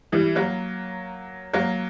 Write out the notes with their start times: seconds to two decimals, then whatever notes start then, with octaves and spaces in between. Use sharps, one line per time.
0.12 E3 G3
0.35 F#3 A#3
1.53 F#3 A#3